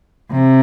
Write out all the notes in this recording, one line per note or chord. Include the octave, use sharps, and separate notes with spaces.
C3